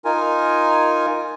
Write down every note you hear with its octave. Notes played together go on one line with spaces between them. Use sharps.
D#4 F4 A#4 G#5